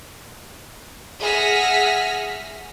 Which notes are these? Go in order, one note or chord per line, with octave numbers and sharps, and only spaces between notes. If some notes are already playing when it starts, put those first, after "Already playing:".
G#4 E5 F#5 F6 A#6 B6